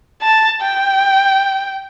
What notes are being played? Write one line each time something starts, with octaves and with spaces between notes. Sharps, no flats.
A5
G5